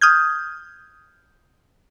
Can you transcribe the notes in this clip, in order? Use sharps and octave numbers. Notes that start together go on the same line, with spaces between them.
D#6 F6 G6 G#6